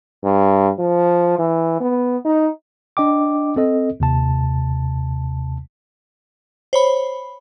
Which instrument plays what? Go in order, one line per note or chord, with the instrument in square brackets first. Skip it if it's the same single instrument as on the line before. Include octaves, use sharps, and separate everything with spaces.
[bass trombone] G2
F3
E3
B3
D#4
[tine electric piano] D4 D#5 G5 D6
C4 A4 D#5
D#2 C3 A5
[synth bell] C5 C#5 B5